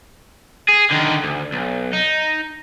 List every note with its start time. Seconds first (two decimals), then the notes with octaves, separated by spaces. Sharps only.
0.68 G#4
0.91 D3 D#3
1.23 D2
1.53 B1
1.93 D#4